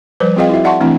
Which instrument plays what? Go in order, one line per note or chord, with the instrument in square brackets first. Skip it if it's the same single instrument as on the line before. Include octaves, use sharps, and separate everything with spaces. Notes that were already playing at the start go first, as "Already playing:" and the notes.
[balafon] F3 G3 B4 C5
C4 F4 G#4 D#5 F5 G5
E4 F#4 E5
D5 E5 F#5 A5 C6 C#6
E3 A3 C4 D4 E4